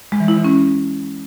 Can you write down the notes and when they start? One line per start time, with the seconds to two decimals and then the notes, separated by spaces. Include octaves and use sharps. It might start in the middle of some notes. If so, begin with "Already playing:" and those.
0.12 G#3
0.20 E3
0.28 E4
0.36 E3
0.44 C#4